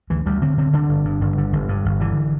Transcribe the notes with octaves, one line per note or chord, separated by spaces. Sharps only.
D2 E3
D2 G3
D3 C4
D3 C4
D3 D4
G1
G2
G1
D3
G1
G2
G1
D3 E3